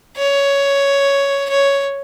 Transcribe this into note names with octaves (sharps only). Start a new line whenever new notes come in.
C#5
C#5